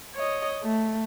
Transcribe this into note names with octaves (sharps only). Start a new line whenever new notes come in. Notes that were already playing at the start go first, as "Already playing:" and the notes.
C#5 D#5
A3